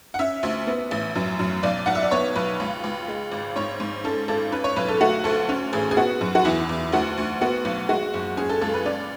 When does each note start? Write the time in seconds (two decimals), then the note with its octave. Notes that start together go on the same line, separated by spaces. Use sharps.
0.14 F#5
0.19 C#4 E5
0.43 D2 E5
0.67 B3
0.91 A1
1.15 F#2
1.39 F#2
1.63 B1 D5
1.86 B1 F#5
1.95 E5
2.03 D5
2.11 B3 C#5
2.35 B1 B4
2.60 C#2
2.84 C#2
3.08 G#3
3.32 G#1
3.56 G#2 C#5
3.80 G#2
4.04 C#4 A4
4.28 G#1 A4
4.52 C#4 B4
4.64 C#5
4.76 B1 B4
4.88 A4
5.00 A3 F#4
5.24 D2 A4
5.49 C#4
5.73 A1 G#4
5.91 G#4
5.97 B3 F#4
6.21 F#2
6.35 F#4
6.45 E2 E4
6.69 E2
6.92 D2 F#4
7.18 D2
7.41 B3 F#4
7.65 B1
7.89 G#3 F#4
8.13 F#1
8.37 C#4 G#4
8.49 A4
8.62 C#2 A4
8.74 B4
8.86 C#4 D5